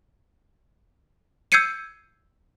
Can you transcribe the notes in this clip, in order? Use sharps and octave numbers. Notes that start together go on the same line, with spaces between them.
E6 G6 G#6 C7 C#7 D#7